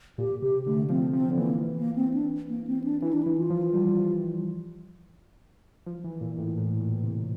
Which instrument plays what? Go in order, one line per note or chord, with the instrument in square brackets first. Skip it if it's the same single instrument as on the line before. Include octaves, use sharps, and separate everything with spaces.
[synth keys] A#2 [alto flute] G4
[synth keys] C3 [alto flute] G4
[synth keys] D3 [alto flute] A3
[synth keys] F3 [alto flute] C4
[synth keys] F3 [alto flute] C4
[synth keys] D3
[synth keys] E3 [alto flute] A#3
[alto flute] A#3
C4
D4
A#3
C4
D4
[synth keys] E3 [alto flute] E4
[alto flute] D4
[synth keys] E3 [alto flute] E4
[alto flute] F4
[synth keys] F3
G3
F3
E3
A#2
A2
A2
A#2
C3